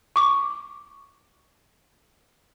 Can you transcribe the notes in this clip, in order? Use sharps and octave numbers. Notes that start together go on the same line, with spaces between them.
C#6 D6